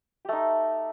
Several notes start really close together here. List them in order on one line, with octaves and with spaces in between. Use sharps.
G4 A3 D#4